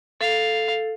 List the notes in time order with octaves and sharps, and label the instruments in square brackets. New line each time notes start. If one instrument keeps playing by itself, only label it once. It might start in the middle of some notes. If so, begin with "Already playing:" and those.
[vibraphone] A4 [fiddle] F5